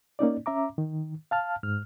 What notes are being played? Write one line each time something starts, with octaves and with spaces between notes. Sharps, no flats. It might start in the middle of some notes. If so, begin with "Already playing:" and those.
A#3 C#4 D#4 D5
C#4 E5 A#5 D6
D#3
F5 A5 F6
G#2 F6